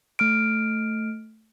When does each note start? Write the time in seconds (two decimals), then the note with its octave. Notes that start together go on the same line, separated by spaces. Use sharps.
0.19 A3 F6 D7